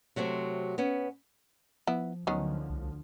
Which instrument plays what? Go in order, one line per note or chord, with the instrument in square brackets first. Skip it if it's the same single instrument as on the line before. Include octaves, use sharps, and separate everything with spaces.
[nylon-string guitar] C3 F#3 A3 C4
B3 C#4
[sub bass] F3 [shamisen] B3 E4
[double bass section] D2 D3 F3 [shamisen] D#3 B3 C#4 [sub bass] F#3
[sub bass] C2